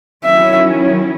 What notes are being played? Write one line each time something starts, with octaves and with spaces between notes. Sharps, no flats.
D#3 F#3 C#4 E4 E5